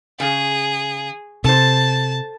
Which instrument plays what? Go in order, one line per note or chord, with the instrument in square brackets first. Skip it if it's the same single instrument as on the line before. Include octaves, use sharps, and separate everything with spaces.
[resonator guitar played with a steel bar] C#3 [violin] G#4
[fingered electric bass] C3 [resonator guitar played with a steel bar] A4 C5 [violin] A5